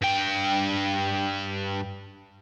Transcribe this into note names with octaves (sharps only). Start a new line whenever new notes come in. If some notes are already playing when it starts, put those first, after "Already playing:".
G2 G5